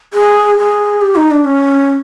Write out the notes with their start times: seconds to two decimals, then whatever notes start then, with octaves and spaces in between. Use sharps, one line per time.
0.14 G#4
0.58 G#4
1.01 G4
1.16 D#4
1.31 D4
1.45 C#4